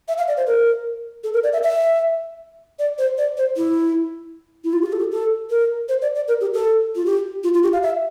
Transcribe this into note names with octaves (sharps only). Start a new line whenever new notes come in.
E5
F5
D5
C5
A#4
A4
A#4
D5
E5
E5
D5
C5
D5
C5
E4
E4
F4
G4
F4
A4
G4
A4
A#4
C5
D5
D5
A#4
G4
A4
F4
G4
F4
F4
G4
F5
E5